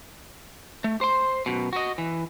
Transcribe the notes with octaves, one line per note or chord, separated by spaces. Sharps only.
A3
C5 C6
F#2 B2
F#4 D#5
E3